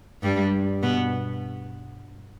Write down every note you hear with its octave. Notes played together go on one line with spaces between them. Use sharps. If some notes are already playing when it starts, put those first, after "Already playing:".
G2 G3
B2 B3